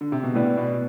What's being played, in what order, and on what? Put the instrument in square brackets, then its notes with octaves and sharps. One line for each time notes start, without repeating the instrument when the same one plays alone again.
[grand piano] D3
C3
B2
[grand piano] A2 [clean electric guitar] B3 E4 B4 D5
[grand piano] B2